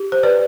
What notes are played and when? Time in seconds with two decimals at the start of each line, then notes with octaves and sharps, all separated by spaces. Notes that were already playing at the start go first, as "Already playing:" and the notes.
Already playing: G4
0.12 C5
0.23 B4 D5